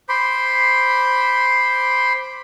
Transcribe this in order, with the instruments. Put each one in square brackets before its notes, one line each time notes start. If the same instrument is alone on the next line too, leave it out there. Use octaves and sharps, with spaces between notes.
[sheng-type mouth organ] C5 B5 C6 D6